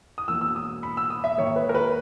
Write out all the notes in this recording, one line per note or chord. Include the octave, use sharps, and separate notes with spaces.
D#6
E1 E2 B2 A#3 E6
E6
D#6
B5
E6
D#6
E5
G#2 D#3 A#3 C#5
B4
A#4
B4